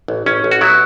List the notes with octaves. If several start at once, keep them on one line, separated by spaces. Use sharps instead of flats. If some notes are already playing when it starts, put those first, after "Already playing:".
A1
A1 C#4
A1
F#4
F#3 B3 E4